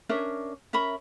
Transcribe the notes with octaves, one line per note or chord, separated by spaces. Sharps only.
C#4 D4 A#4 E5
C#4 A#4 E5 B5